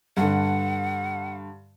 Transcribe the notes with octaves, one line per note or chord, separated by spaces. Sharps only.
G2 D3 F#5